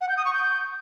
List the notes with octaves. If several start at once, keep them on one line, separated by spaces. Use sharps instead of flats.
F#5
G6
D#6
C#6
G6